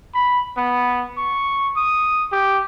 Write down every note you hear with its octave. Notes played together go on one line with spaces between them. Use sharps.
B5
B3
C#6
D#6
G4